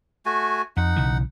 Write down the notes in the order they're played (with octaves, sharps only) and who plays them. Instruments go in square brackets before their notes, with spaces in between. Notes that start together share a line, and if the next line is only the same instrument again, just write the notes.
[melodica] A3 F#4 G#5
[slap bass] F2 [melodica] D#4 F#5
[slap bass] B1 C#3 E3